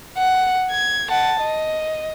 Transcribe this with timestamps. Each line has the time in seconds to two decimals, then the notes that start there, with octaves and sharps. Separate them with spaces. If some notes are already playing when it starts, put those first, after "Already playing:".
0.18 F#5
0.71 G#6
1.10 F#5 A5
1.41 D#5